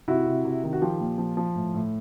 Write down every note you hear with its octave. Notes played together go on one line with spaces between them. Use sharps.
C3 E4 F#4
C3
C3
D#3
F#4
F3 F4 G4
A#2
F3
F3
A2
A2